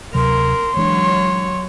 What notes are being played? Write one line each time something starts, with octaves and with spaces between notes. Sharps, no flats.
D2 C3 F#3 A#4 C6
E3 F#3 G#3 D4 C#5